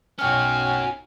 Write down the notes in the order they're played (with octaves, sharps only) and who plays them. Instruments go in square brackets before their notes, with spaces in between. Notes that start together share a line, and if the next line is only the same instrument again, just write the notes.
[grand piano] B1 C#7 [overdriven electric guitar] C#4 F#4 [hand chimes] G5 F6 [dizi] G#5